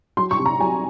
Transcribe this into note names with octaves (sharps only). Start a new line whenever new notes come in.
F#3 C6
C#6
C3
A#5
F#3 G#5